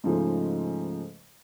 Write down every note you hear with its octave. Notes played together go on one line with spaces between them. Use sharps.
G#2 C#3 F3 G#3 A3